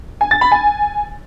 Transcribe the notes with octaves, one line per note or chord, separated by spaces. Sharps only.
G#5
A6
B5
G#5